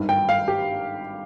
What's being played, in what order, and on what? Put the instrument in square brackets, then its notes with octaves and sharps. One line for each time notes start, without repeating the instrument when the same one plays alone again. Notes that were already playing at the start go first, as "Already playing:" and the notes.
Already playing: [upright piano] G#1 G2 D#3
G5
F5
G4